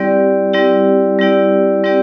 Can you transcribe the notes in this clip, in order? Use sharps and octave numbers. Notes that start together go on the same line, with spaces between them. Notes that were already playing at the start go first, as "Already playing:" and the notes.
Already playing: G3 C4 E4 G4 D5
G3 C4 E4 G4 D5
G3 C4 E4 G4 D5
G3 C4 E4 G4 D5